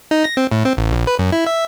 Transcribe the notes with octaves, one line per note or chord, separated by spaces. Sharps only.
D#4
A#6
C4
A2
C4
A1
A#1
B4
F#2
E4
E5